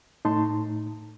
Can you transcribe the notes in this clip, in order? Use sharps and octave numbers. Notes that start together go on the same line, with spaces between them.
A2 A3 D#4 A5 C6